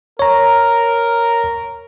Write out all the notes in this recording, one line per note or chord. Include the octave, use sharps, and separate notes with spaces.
A#4 C#5 A#5